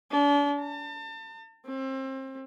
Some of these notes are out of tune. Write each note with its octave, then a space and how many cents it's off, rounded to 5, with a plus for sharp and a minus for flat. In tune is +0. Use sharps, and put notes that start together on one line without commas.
D4 -40
A5 +35
C4 +30